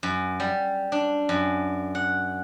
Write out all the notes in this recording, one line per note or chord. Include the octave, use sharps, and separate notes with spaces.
F#2
G3
D4
F#2
F#5